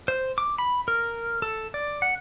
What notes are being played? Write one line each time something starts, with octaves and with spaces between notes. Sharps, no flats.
C5
D6
B5
A#4
A4
D5
F#5